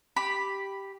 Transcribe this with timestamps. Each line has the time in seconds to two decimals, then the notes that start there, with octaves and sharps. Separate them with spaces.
0.16 G4 B5